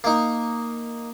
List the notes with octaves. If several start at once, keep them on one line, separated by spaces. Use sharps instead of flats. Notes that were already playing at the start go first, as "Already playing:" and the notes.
A#3 D#4